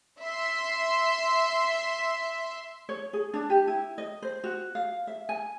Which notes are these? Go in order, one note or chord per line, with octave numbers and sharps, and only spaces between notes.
E5 C6
C#5
G#4
D4
G4
E4
D#5
C5
F#4
F5
E5
G#5